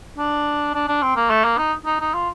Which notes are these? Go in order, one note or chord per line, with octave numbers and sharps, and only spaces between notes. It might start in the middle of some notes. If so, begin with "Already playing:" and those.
D4
D4
D4
C4
A#3
A3
A#3
D#4
D#4
D#4
F4